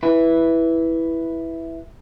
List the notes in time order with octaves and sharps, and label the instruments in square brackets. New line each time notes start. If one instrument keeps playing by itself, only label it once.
[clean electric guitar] E4 B4